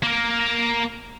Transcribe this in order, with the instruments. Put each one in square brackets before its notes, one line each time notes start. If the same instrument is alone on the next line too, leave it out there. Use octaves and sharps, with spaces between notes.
[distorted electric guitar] A#3 A#4